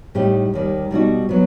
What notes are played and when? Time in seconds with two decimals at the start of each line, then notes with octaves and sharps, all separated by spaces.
0.15 A2 G3 D#4 G4
0.54 D#2 D#3 G3
0.91 B2 G3 D#4 F#4
1.29 F#3 B3